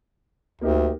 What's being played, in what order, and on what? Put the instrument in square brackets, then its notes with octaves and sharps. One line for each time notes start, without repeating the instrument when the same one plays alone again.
[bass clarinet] D2 [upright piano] A#3 D#4 G4